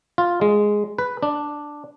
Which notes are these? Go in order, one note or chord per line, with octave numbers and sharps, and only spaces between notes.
F4
G#3
B4
D4